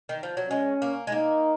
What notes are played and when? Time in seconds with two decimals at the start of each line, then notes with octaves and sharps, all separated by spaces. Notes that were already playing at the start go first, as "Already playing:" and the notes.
0.09 D#3
0.23 F3
0.37 F#3
0.50 G#3 C#4
0.82 A#3
1.07 G#3
1.12 A#3 D#4